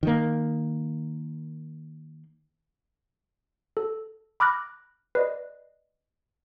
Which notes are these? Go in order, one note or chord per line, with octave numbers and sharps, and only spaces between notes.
D#3 A#3
A4
B5 D6 F6 F#6 A#6
B4 D5 D#5